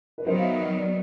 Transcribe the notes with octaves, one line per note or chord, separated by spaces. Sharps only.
B4
D#3 F#3 B3 C5
F5
E5
D#5
D5